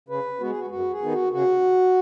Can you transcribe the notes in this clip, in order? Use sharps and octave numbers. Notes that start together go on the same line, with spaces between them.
C#3 B4
G#3 B3 F#4
G#4
F#4
F#2 F#4
G#4
D#3 B3 D#4
F#4
C#3 F#4